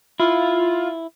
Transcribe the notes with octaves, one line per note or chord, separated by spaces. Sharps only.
E4 F4